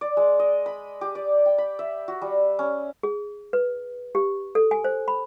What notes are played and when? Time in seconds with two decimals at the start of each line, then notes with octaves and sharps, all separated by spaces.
0.01 D5
0.17 G#3
0.39 D#5
0.66 B5
1.01 G4
1.15 D5
1.46 G5
1.58 B5
1.79 E5
2.08 F#4
2.22 G3
2.59 C#4
3.03 G#4
3.53 B4
4.15 G4
4.55 A4
4.71 G#5
4.84 C5
5.08 B5